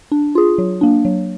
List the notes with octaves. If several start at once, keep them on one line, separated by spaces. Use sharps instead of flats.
D4
F4 G#4
F#3
A#3 D4
F#3